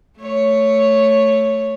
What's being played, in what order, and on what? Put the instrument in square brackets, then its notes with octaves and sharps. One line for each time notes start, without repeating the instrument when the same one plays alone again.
[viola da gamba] A3 C#5